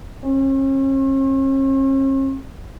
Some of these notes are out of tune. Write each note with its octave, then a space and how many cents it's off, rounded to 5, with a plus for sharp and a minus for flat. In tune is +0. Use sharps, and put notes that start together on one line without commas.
C#4 -45